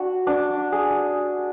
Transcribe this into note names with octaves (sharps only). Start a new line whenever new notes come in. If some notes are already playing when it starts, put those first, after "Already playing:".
Already playing: D4 F#4
D4
G#4